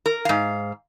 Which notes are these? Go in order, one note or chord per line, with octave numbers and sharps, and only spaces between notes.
A#4
G#2 F5